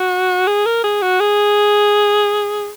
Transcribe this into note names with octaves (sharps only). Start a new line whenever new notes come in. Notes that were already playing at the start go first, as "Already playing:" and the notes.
Already playing: F#4
G#4
A#4
G#4
F#4
G#4